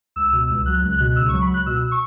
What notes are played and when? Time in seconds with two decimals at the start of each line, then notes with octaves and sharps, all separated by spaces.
0.16 C#2 E6
0.32 B2
0.49 C#2
0.66 F#3 F#6
0.83 C#2
0.91 F#6
0.99 B2
1.16 C#2 E6
1.29 F#3 C#6
1.41 B5
1.50 C#2 F#6
1.66 B2 E6
1.91 C#6